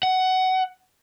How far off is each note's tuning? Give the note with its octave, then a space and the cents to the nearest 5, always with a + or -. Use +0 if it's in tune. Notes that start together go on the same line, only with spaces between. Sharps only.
F#5 +15